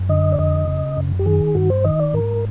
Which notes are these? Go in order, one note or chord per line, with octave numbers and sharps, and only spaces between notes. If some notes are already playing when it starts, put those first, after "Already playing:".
Already playing: F#2
D3 D#5
D5
F2 D#5
C#3
F#2
G4
D#3 G#4
G2 F#4
C5
D#3 D#5
D5
G#2 A#4